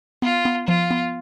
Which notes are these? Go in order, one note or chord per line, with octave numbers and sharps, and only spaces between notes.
B3 F4
B3
F3 F4
B3